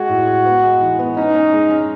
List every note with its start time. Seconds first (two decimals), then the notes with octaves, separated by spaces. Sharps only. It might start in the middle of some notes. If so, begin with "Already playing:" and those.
Already playing: G#3 F#4 G#4
0.09 A2
0.27 G#4
0.45 B3
0.63 G#3
0.81 E3
0.99 B3
1.17 C#4 D#4
1.35 C#4
1.53 G#3
1.71 C#4